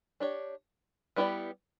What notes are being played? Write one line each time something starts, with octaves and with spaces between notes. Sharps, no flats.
D4 G4 C#5
G3 B3 E4 G4 D5